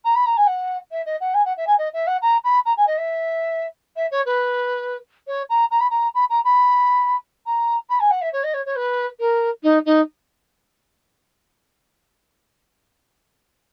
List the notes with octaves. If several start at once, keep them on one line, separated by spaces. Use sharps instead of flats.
A#5
B5
A#5
G#5
F#5
E5
D#5
F#5
G#5
F#5
E5
G#5
D#5
E5
F#5
A#5
B5
A#5
G#5
D#5
E5
E5
C#5
B4
C#5
A#5
A#5
B5
A#5
B5
A#5
B5
A#5
B5
G#5
F#5
E5
C#5
D#5
C#5
C#5
B4
A#4
D#4
D#4